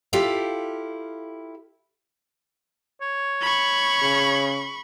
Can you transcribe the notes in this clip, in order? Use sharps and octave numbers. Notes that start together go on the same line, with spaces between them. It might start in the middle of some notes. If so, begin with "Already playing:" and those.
E4 F4 G4 A4 F5
C#5
B5 C#6
C#3